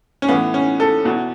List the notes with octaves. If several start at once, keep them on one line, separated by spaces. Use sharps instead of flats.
C#4
A2 E3 B3
C#4
A4
E2 B2 F#4